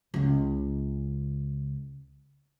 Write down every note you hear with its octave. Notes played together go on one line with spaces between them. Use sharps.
C#2 C#3